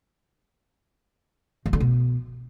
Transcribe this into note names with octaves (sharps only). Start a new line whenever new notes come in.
D#3
D3
B2